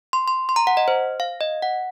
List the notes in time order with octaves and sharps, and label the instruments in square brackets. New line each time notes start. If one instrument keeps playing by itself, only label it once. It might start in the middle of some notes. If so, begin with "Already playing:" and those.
[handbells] C6
C6
C6
A#5
F#5
D#5
C5
F5
D#5
F#5